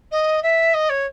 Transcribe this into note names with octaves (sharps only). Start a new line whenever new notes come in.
D#5
E5
D#5
C#5